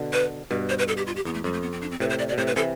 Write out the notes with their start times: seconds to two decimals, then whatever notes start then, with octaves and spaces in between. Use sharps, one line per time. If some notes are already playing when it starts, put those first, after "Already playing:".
Already playing: B2 D3
0.13 B4
0.50 G2 B2 B4
0.69 C5
0.78 B4
0.88 A4
0.97 G4
1.07 F4
1.16 G4
1.25 E2 B3
1.34 A3
1.44 F2 G3
1.53 A3
1.62 B3
1.73 C4
1.82 D4
1.91 C4
2.00 A2 C3 B4
2.10 C5
2.19 D5
2.29 D5
2.33 B2
2.38 A2 C3 C5
2.47 B4
2.56 C3 E3 A4